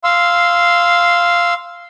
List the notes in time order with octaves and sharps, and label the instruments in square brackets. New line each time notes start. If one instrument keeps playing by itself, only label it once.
[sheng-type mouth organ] F5 C6 E6